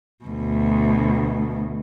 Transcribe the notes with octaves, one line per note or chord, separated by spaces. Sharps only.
D2 B2